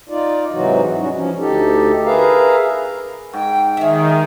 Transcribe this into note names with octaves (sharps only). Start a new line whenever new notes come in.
D#4 F4 D5
G#2 C3 E3 F#3 D#4 F#4
G3 C#4 D#4 F#4
F3 C#4
D2 D#4 G4 A4
G#4 A#4 B4 E5 F5 A#5
G#2 G5
D#3 G#4 C#5 E5